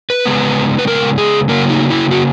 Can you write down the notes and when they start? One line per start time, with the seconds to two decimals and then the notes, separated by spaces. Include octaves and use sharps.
0.10 B4
0.26 C#3 G#3 B3
0.79 B4
0.87 A#4
1.18 G#4
1.49 C#3 F#3 A#3 A#4
1.69 D#4
1.90 E4
2.11 F#4